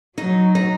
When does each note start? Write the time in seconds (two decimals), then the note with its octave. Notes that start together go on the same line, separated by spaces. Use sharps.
0.18 F#3 D#4
0.55 D#4